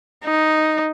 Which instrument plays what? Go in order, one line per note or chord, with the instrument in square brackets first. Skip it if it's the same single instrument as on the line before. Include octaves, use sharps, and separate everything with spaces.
[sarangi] D#4